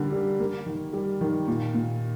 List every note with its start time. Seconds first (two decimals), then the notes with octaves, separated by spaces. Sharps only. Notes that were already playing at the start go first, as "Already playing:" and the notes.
Already playing: D3 G3 A#3
0.12 G3
0.39 A#3
0.66 D#3
0.93 G3
1.21 D#3
1.48 A#2
1.75 A#2